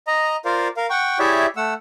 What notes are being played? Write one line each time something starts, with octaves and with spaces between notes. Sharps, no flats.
D#5 A#5
F4 A#4 C5 D5 F5
A#4 F5
F#5 G5 C#6
E4 G4 G#4 C#5 D5 E5
A3 F#5 E6